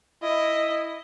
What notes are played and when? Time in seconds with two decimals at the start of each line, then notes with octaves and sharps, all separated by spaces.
0.23 E4 D#5